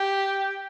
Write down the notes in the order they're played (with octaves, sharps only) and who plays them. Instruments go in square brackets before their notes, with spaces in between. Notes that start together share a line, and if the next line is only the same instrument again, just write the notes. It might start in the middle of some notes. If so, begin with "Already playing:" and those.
Already playing: [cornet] G4